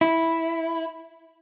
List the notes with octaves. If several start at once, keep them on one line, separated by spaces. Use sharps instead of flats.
E4